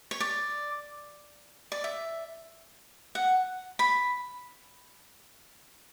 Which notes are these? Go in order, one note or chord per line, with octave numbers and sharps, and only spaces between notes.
C#5
D5
D5
E5
F#5
B5